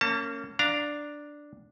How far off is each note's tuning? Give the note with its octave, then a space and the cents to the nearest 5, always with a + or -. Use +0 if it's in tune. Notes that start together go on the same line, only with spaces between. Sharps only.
A#3 -25 C#4 +0 A5 +25
D4 +0 F5 +0 A#5 +0